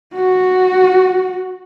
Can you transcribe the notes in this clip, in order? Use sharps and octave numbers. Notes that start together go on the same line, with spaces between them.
F#4